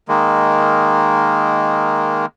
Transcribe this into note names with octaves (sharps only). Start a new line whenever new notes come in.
D#3 G#3 A#3